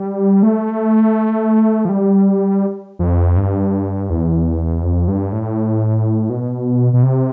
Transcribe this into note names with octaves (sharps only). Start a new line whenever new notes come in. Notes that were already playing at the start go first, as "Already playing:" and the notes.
Already playing: G3
A3
F3
G3
F2
G2
E2
F2
G2
A2
B2
B2
C3